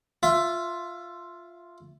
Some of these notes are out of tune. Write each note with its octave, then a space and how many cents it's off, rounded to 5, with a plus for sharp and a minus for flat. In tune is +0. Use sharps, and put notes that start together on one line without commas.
F4 +0 E5 +20